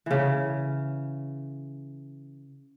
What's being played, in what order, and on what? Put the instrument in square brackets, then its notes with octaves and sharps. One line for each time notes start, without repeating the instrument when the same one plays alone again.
[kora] C#3 E3